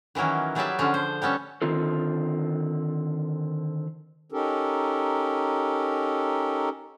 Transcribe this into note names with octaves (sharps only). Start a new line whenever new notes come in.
D#3 E3 F#3 A#3 C#4
F#3 G3 G#4 B4 D5 E5
D3 F3 C#4
C5
G3 B3 C#4 A4
D3 D#3 C4 F4 A4
C#4 D#4 G4 A4 A#4